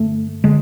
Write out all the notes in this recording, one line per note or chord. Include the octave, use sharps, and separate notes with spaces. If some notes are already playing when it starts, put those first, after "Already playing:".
Already playing: G2 D3 A3
D3 G#3